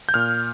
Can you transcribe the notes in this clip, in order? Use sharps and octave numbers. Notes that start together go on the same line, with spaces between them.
G6
A#2 F6